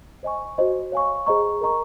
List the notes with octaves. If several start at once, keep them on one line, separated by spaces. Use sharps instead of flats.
C5 D#5 G#5 C#6
F#4 C5 D#5
C#5 F5 G#5 C#6
G#4 C5 D#5 A#5 C#6
A#4 D#5 A#5 C#6